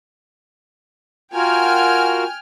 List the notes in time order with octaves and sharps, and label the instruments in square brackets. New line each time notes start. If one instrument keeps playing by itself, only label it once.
[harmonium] F4 F#4 A#4 [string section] G5 G#5 F6